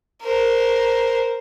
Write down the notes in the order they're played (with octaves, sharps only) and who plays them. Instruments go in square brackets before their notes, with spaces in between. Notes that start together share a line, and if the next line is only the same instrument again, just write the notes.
[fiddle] A#4 C5